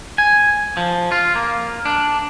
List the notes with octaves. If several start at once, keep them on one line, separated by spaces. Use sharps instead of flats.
G#5
F3
F4
A#3
D4